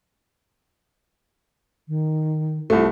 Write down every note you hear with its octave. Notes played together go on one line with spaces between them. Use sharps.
D#3
C2 A3 F4